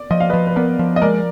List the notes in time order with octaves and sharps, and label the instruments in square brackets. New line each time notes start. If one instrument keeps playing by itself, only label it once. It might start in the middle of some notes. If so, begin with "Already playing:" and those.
Already playing: [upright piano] D5
[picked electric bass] F3 [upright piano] D#5
[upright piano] F5
[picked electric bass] F3 [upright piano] B4 D#5
[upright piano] B4
[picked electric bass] B3 [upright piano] A#4 D5
[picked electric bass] F3
[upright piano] D#5
[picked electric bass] G#3 [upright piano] A#4 D5